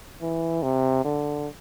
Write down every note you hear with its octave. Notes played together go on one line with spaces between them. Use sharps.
E3
C3
D3